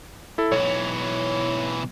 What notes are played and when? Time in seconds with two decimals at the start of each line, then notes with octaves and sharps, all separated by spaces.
0.38 E4 A4
0.52 B1 E3 C#5